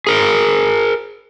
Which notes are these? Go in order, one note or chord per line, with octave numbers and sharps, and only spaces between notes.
G#4 A#4